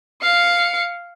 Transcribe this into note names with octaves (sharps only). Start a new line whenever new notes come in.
F5 C#7